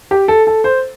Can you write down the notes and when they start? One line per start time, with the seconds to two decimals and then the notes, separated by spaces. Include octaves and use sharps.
0.11 G4
0.28 A4
0.47 A4
0.64 C5